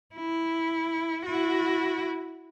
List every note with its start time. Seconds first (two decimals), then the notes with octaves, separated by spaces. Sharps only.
0.15 E4
1.26 E4 F#4